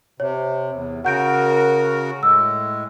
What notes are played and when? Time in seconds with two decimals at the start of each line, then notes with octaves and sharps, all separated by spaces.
0.20 C3 C#5
0.72 E2
1.05 C#3 F#4 A#4 F#5 G6 D7
2.23 A2 G#3 E6